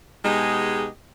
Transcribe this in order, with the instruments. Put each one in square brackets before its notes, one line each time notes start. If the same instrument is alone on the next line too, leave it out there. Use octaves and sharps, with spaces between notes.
[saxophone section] B2 G#3 D#4 G4 G#4 D#5